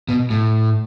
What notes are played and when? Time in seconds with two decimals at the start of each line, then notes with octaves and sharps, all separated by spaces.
0.08 B2
0.30 A2